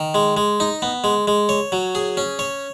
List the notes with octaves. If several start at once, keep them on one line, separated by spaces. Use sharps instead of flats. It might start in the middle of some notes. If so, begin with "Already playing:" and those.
Already playing: D#3
G#3
G#3
D#4
B3
G#3
G#3
C#5
F#3
G#4
C#4
C#5